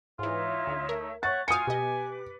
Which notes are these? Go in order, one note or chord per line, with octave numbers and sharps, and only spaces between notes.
G#2 E3 D#4 F4 C#5 E5
D2
A3 A#4
C#5 E5 F#5 C#6 A6
F4 F#4 F5 G5 G#5 D#6 C#7
B2 G4 B4 D#5 D6